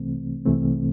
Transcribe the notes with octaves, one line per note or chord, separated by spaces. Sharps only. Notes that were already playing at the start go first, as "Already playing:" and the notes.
Already playing: C2 C3 E3 A3 C4
C2 C3 E3 A3 C4